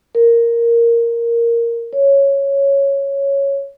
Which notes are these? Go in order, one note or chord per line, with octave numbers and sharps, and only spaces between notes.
A#4
C#5